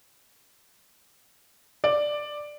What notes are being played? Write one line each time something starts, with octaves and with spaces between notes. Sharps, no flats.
D5